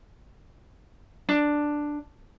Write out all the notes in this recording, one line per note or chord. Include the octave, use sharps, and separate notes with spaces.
D4